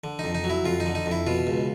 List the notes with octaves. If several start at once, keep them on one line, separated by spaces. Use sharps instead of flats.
D3
F2 D#4
D#4
F#3
E4
F2 F4
D#4
D3
D#4
F2
E4
B2 F4
C#2